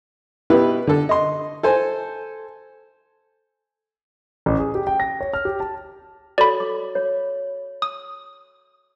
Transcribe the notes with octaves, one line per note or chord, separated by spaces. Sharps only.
B2 E4 G4 B4
D3 A4
D#5 C6
A4 C5 G#5
A1
G#4
G4
G5
A#6
C#5
F6
G4
A5
F#4 A4 C#5 D5 B5
D6
C#5
D#6